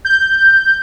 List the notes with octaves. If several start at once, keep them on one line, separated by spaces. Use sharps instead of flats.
G6